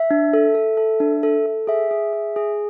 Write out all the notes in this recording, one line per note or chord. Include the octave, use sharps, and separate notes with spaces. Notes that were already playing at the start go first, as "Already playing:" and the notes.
Already playing: E5
D4
A4
A4
A4
D4
A4
A4
G#4 E5
G#4
G#4
G#4